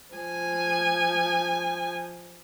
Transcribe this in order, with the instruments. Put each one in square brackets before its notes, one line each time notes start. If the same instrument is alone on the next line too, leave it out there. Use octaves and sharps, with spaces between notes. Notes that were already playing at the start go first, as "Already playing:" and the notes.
[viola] F3 G#5